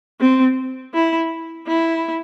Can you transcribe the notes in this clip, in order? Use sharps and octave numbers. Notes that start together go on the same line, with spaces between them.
C4
E4
E4